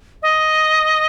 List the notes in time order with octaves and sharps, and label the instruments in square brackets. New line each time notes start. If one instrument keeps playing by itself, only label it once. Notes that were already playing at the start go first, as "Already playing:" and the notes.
[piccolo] D#5